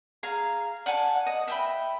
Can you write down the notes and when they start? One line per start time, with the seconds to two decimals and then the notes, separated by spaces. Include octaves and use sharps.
0.23 G#4 F5 A#5
0.86 D5 F#5 G#5 A5
1.26 D#5
1.48 E5 G5 B5